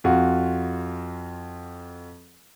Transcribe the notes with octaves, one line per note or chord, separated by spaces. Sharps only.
F2 F4 F#4